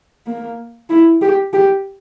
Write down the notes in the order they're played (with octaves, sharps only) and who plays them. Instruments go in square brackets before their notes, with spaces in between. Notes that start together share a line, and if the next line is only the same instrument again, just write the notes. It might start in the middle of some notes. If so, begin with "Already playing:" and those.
[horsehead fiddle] A#3
E4
G4
G4